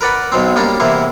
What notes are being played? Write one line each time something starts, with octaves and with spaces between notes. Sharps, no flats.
A#4 B4 D5 F#5 B5
B1 B2 F#3 C4
G3 A#3 C#4 D4
E2 C3 E3 A#3 E4